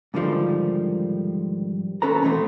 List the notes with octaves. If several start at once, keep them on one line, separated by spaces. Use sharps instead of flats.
G#2 D3 D#3 F3 G3
D#2 C#4 A4 B4 A#5
B2 E3 A3 B3 C4